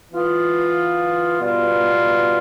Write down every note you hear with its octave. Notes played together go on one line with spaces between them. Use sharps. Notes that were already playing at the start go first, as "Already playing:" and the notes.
E3 B3 F4
B2 G3 B3 F4